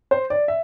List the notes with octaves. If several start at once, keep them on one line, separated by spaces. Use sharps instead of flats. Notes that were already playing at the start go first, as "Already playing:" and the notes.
C5
D5
E5